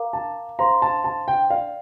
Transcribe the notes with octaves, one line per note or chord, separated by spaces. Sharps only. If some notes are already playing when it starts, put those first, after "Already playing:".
Already playing: A#4 F5 A#5 D6
A5
C5 F5 A#5 C6
A5
A5
G5
A#4 D5 F5 G5